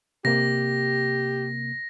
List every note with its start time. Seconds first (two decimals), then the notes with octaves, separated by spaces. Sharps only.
0.25 C3 A#3 G4 A#6